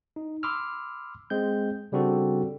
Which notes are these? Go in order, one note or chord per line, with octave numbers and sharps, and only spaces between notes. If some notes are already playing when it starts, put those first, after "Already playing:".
D#4
B5 C6 D6 E6 F6
G#3 C4 G6
C#3 G3 C4 D4 F#4 A4